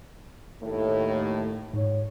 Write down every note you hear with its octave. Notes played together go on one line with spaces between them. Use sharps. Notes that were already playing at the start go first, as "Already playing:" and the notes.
D#2 A2
G#2 C#5